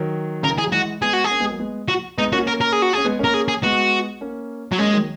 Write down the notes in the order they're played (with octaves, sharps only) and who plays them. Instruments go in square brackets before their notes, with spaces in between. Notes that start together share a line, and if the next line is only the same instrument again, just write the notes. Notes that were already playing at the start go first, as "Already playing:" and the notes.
Already playing: [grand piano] D#3 F#3
[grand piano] C#3 [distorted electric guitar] A#4
[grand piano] D#3
[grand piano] E3 [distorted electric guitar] G#4
[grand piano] F#3
[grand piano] E3 G#3 [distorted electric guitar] F#4
[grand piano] G#3 B3 [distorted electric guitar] G#4
[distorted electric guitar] F#4
G#4
[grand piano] A#3 C#4
G#3 B3
F#3 A#3
G#3 B3
[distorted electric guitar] F#4
[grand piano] G#3 B3 [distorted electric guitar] D#4
[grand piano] A#3 C#4 [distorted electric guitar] F#4
[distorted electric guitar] A#4
A#4
G#4
F#4
[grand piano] C#4 [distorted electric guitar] G#4
[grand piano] G#3 B3
[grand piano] A#3 C#4 [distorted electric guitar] A#4
[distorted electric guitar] G#4
G#4
[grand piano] G#3 B3 [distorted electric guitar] F#4
[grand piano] A#3 C#4
[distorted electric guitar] F#3
[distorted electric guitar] G#3 [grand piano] A#3 C#4
[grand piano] D#3 F#3